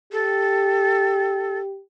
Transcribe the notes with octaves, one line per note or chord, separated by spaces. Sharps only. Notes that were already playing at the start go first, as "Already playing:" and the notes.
G4 A4